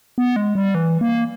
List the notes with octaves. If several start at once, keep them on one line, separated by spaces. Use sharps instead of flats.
B3
G#3
G3
E3
A#3